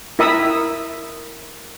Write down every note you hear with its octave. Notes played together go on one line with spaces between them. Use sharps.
E4 A#4 E5 B5 D#6